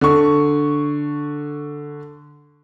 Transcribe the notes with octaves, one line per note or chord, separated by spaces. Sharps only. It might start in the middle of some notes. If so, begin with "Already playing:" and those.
D3 C#6